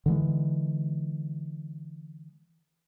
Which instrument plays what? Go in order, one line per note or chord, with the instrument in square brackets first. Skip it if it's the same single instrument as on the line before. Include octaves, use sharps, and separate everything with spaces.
[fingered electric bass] D3 E3 G#3